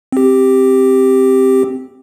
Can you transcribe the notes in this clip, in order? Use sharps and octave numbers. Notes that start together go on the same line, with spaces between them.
C4 G4